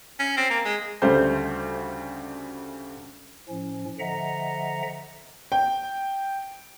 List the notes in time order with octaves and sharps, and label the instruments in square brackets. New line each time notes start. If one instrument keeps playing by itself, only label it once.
[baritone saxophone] C#4
C4
A#3
G#3
[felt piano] D2 C#3 G3 A3 C5 G6
[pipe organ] A2 F3 C#4
D3 F3 D#5 E5 F#5 A#5
[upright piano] G5